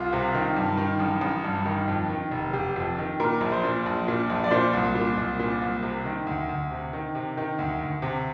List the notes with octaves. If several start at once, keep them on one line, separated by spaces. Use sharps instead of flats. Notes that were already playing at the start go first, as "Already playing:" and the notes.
Already playing: C2 F4
C3
D#3
G2
D#3
A1
A1
G2
D#3
F2
D#3
F1
F1 G4
F2
D#3
A#2 A#4
A#1
C5
A#2
A#1
A#2
A#1
D5
A#2 C5
C2
A#2
C2
A#2
C2
C3
D#3
D2
D2
C3
D#3
C3
D#3
D2
D2
C3